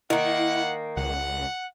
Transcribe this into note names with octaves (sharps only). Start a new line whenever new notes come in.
D#3 A#3 E4 F#5
C#2 F#5